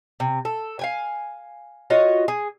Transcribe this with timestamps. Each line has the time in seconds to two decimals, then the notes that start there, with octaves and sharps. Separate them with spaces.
0.20 C3
0.45 A4
0.79 F5 G5 G#5
1.90 F4 F#4 C#5 D#5
2.28 G#4